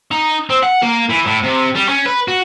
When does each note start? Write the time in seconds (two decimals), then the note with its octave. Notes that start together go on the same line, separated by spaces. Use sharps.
0.11 D#4
0.50 C4
0.63 F#5
0.82 A#3
1.09 E3
1.26 A2
1.43 C3
1.75 G3
1.89 C#4
2.06 B4
2.28 F#4